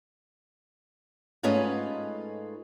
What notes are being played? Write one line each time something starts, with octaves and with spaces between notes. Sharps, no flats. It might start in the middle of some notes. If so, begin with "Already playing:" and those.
G#2 A3 C#4 F4 B4 D#5